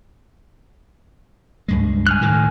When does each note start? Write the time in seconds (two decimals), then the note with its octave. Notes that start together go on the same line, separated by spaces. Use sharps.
1.68 C#2 G2 G#3
2.07 G#5 F6 F#6
2.21 A2 D#3